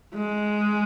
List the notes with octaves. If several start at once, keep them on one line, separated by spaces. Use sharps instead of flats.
G#3